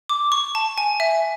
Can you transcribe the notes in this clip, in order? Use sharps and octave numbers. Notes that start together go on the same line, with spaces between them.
D6
C#6
A5
G#5
E5